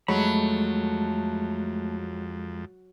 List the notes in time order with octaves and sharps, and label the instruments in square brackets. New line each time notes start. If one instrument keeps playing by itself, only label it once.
[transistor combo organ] F2 [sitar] F#3 [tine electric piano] G#3 [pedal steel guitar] A3 B5